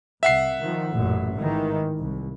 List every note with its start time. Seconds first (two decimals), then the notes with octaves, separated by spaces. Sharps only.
0.23 C2 E5 F#5 C7
0.60 D#3 F3
0.93 A1 F#2 A#2
1.34 G#2 D#3 E3
1.98 C2